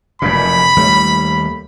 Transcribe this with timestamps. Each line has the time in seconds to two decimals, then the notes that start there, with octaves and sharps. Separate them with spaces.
0.22 F1 F#2 A#2 B5
0.76 D#2 G3 A3